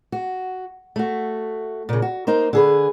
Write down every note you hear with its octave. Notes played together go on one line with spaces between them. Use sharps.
F#4
A3 F#4
A#2 C#3
F#4
A#3 D#4 A#4 C5
D3 G#4 B4